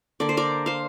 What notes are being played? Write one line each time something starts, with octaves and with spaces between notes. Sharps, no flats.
D3 A#3 D5
C5
A#4 D5
C5 F5